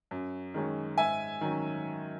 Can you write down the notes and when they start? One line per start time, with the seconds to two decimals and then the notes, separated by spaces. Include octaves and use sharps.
0.11 F#2
0.54 D#3 G#3 C#4
0.98 G#2 E5 G#5
1.41 D#3 F#3 C#4